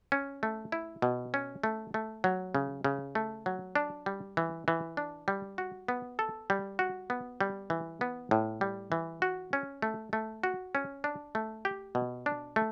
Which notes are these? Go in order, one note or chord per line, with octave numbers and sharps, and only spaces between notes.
C#4
A3
E4
B2
C#4
A3
A3
F#3
C#3
C#3
A3
F#3
D4
G3
E3
E3
D4
G3
F#4
B3
A4
G3
F#4
B3
G3
E3
B3
A2
G3
E3
F#4
C#4
A3
A3
F#4
C#4
D4
A3
G4
B2
D4
A3